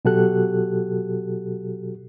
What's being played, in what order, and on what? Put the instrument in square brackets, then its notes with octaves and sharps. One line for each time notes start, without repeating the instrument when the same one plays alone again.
[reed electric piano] B2 F#3 F#4 G4 A4 F#6